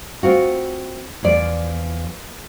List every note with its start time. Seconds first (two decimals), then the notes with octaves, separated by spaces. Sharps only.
0.23 C4 F4 F#4
1.23 E2 F3 D5